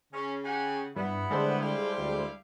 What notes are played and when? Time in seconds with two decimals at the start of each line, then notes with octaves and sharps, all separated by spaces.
0.13 C#3 C#4
0.44 G4 F#5 G#5
0.96 G2 B3 E4
1.31 D3 G3 G#3 A4 C5
1.61 E4 G4 F5
1.97 D2